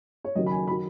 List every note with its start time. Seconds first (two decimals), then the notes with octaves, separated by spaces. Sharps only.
0.24 C#5
0.35 F#1 F#2 D#3 F#3 D#5
0.46 B5
0.51 G#5
0.67 B5
0.70 D#3 F#3